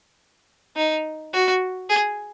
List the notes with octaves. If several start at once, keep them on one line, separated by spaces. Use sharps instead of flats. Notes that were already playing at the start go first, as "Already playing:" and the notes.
D#4
F#4
G#4